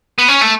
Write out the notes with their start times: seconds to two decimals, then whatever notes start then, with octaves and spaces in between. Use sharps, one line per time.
0.19 B3
0.28 C#4
0.41 A3